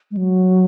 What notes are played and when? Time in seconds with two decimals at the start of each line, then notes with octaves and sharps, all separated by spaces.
0.11 G#3
0.17 F#3